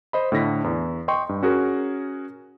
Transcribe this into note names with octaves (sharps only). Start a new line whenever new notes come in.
C5 D#5 B5
A2 D3 A#6 B6
E2
D#5 G5 C6 C#6
G2
C#4 F#4 G#4 A#4